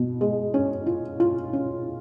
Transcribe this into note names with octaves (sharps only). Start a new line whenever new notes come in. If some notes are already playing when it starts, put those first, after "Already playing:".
Already playing: B2
G#3
C#4
F4
F4
C#4